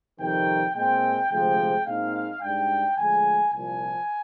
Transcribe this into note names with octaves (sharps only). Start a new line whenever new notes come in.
F2 C3 D#3 G3 G5
A#2 G#3 C4 G5
D2 C3 F3 G#3 G5
A#2 G#3 C4 D#4 F5
G#2 G3 D4 G5
D2 D3 F3 G#3 G#5
C2 A#2 F3 G#5